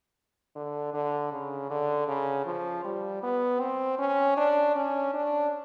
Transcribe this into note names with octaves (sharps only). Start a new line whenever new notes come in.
D3
D3
C#3
D3
C#3
F3
G3
B3
C4
C#4
D4
C#4
D4